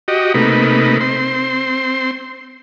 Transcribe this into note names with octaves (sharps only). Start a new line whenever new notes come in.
F#4 G4 D#5
C3 A3 A#3 D#4 B4
C4 C6